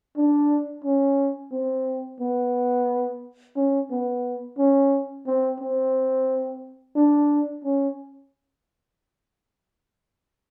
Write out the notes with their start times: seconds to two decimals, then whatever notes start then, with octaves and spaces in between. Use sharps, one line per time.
0.16 D4
0.84 C#4
1.52 C4
2.20 B3
3.56 C#4
3.90 B3
4.58 C#4
5.26 C4
5.60 C4
6.96 D4
7.64 C#4